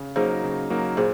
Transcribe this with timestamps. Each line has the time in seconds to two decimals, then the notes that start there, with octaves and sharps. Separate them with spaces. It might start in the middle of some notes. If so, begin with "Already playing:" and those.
Already playing: C#3
0.16 F#3 A#3 D#4 G#4 A#4 C5
0.44 C#3
0.70 F#3 A#3 D#4 A#4
0.97 A#2 G#4 C5